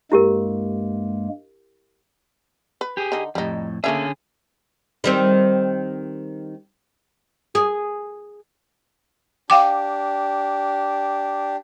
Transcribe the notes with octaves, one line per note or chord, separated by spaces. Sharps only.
G2 G#3 A#3 E4 G4 A#4
B4
G4 G#4
D3 D#4
F2 A2 G3 D#4
D3 A3 A#3 C#4 G#4 E5
D#3 G3 C4
G#4
D4 G4 F5 G5 D6